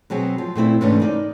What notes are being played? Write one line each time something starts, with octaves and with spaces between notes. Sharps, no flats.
B2 F#3 C4 G#4
F3
A#2 A3 C4 E4
G#2 C3 E3 A3 C#4 D4
A#3 D#4 D5